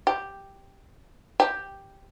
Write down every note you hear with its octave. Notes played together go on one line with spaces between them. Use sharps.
G4
G4